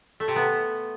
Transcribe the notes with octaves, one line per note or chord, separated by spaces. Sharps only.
A3
C3
B3